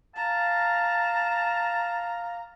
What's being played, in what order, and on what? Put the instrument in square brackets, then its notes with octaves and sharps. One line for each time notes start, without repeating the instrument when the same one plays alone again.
[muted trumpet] F5 [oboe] A5 [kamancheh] A#5